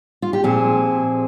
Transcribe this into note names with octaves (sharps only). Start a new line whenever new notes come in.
F4
G4
A#2 F3 C4 G#4